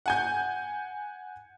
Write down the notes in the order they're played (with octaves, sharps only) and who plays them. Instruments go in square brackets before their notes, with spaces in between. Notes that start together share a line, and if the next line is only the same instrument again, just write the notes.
[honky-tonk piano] F#5 G#5 G6